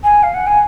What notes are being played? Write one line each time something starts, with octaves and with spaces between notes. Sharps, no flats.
G#5
F5
F#5
G#5